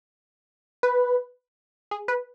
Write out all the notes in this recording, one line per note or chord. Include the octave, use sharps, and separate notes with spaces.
B4
G#4
B4